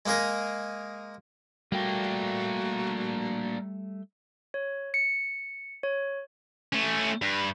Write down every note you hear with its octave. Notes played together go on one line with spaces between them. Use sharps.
G#3 A#3 D#4 G#4 A#4
G3 A3 A#3 D4 F#4 G5
C#5
C#7
C#5
A3 C#4
G2